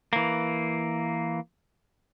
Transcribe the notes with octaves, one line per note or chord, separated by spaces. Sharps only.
E3 A#3